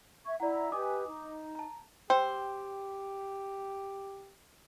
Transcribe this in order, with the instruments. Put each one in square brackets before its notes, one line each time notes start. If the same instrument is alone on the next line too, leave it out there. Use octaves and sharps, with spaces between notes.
[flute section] E5 C#6 G#6
[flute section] E4 A#5 [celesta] D5 F#5
[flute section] G4 B4 G#5 [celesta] D#5 D6 D#6
[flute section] D#4
[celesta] A5 A#5
[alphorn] G4 [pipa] C5 [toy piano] G5 E6